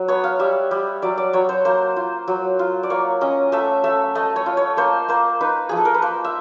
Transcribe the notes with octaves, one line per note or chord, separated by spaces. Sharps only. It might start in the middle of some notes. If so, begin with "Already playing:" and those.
Already playing: F#3
B3 C#5
F5
G3 E5
G3
F#3 D5
D5
F#3 C#5
C5
A#3 C5
F4
F#3
F4
D5
A#3 C#5
C#4 D#5
A3 E5
A3 E5
A3 D#5
C#5
F4
C#5
A#3 C5
A#3 C5
D#4 B4
F3 G#4
A4
A#4
B4
A#3 C5
E5